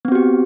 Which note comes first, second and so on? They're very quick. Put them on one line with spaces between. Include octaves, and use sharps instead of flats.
B3 C4 F#4 G4